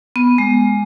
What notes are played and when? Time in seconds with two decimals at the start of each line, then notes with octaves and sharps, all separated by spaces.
0.16 B3
0.38 G#3